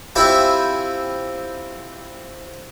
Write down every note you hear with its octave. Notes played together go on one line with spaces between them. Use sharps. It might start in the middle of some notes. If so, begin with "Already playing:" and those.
C4 E4 F4 G4 G#5 B5